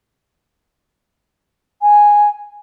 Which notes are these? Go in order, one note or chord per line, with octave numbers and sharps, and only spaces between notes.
G#5